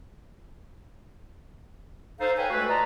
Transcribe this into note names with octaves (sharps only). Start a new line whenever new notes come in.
D#4 A4 C5 F5
A4 B4 C#5 F5 G5 G#5
G#3 A3 F#4 A4 B4
F4 D5 D#5 A5 A#5